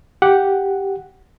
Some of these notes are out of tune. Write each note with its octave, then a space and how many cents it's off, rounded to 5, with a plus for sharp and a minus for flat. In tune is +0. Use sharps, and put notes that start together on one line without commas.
G4 +0 F#5 +0